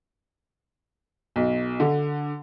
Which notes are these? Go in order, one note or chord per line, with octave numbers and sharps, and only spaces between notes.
B1
D3